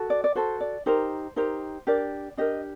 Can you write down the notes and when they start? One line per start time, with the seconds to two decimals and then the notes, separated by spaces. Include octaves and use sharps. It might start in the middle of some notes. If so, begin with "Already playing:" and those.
Already playing: F#4 A4
0.10 D5
0.24 D5
0.35 F#4 A4 C5
0.61 D5
0.86 D#4 G4 A#4 C5
1.36 D#4 G4 A#4 C5
1.87 D4 G4 A#4 D5
2.37 D4 G4 A#4 D#5